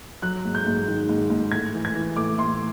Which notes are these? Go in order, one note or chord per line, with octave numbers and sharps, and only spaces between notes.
F#3 F#6
G#2
G6
G#2
D#3
G#2
G#2
A2 G#6
E3
G#6
E3
A2 D6
A2 C6